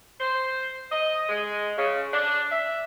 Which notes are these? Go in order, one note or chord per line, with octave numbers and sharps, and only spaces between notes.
C5
D#5
G#3
C#3
D4
E5